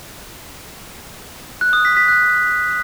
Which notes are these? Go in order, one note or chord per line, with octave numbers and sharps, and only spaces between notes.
F#6
D#6
B6
B6
F#6